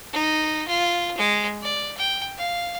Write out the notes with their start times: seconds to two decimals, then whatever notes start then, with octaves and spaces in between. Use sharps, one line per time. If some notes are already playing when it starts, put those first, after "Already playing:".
0.13 D#4
0.68 F4
1.17 G#3
1.63 D5
1.97 G5
2.38 F5